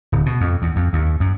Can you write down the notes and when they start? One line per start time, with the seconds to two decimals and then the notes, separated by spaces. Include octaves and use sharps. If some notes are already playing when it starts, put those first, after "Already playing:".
0.12 D1
0.26 B2
0.41 F2
0.62 E2
0.76 F2
0.93 D#2
1.20 F#2